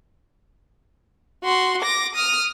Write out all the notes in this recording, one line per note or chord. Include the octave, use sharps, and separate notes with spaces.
F#4 C6
D6 A#6
D#6 F6